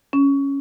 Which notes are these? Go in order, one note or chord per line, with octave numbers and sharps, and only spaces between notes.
C#4